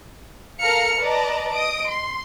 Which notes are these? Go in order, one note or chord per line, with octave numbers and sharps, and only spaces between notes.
A4 A#4 F5 A#5 F6 C#7
B4 D5 D#5 A5 A#5
D#5 D#6 D7
C6